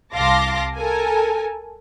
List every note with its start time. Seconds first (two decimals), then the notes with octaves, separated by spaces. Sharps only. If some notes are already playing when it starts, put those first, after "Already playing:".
0.14 C2 F5 A5 C6 D6 A#6
0.76 A4 A#4 G#5